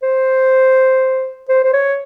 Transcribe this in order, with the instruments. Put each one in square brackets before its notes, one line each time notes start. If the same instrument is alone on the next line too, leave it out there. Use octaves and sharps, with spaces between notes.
[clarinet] C5
C5
C5
C#5